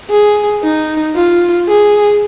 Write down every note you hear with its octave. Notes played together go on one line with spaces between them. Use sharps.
G#4
D#4
F4
G#4